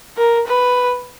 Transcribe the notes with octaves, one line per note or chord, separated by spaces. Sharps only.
A#4
B4